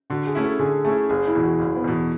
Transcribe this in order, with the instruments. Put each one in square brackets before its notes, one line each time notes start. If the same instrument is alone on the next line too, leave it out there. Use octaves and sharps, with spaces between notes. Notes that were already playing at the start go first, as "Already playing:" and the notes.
[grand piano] D3 [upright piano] F#4
[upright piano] G#4
[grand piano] A3 C#4 E4
[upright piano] A4
[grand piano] D3 [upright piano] G#4
[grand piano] A3 C#4 E4 [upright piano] G#4
[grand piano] F#1 [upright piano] G#4
[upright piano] E4
[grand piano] E2 B2
[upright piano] F#4
[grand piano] F#1
[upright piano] B3
[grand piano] E2 B2